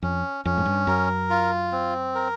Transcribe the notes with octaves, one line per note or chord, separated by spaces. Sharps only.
F2 C#4
F2 C#4
G#2
G2
F#2 A#4
F4
C4
A#4